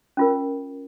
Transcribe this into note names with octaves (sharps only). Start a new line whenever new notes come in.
C#4 F4 A#4